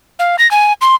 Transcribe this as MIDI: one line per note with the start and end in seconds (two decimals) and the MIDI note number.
0.19 0.36 77
0.39 0.50 94
0.51 0.73 80
0.81 0.95 84